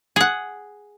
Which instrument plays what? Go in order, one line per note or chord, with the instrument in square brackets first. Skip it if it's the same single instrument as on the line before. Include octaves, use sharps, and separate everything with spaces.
[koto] G#4 F#5